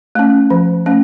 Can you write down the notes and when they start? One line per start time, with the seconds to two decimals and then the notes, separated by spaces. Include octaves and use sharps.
0.15 A3 C#4
0.50 F3
0.86 A3 C#4